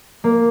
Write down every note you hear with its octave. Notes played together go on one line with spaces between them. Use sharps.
A#3